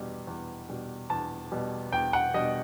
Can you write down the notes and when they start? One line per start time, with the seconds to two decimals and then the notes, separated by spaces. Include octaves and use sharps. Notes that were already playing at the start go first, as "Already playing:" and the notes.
Already playing: E2 B2 G3
0.27 E2
0.69 B2 G3
1.10 E2 A5
1.52 B2 G3
1.92 E2 G5
2.13 F#5
2.34 B2 G3 D#5